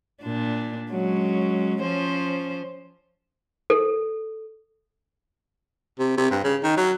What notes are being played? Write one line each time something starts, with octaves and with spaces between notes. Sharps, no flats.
A#2 D4
F#3 G#3 C#4
F3 C#4 C5
A4
C3
C3
G2
C#3
D#3
F#3